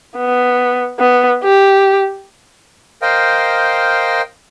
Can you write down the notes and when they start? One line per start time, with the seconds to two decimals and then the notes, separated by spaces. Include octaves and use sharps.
0.17 B3
0.99 B3
1.44 G4
3.02 A#4 C5 D#5 F5 G5